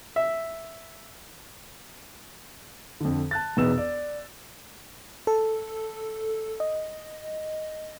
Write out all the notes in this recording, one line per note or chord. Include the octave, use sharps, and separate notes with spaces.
E5
F2 D3
A5 F#6 A6
E1 E2 D#4 B4 E6 E7
D5
A4
D#5